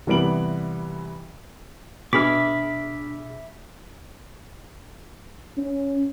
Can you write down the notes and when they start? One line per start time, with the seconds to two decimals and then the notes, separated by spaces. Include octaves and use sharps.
0.07 C3 E3 G3 B3 D7 F#7
2.13 B2 D4 G#4 E5 B5 D6 F6 B6
5.57 C#4